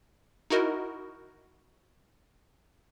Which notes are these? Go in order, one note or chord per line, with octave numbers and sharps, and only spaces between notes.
D#4 E4 F#4 A#4 D#5